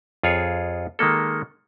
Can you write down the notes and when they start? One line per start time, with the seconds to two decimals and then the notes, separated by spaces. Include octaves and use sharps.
0.23 F2 F4 G#4 C#5
0.99 D#3 G#3 A#3 A4